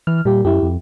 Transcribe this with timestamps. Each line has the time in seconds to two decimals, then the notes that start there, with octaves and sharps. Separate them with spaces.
0.07 E3 F6
0.25 A#2 G3 G4
0.45 F#2 E4 G4
0.63 F2